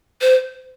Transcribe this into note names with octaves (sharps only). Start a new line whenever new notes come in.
C5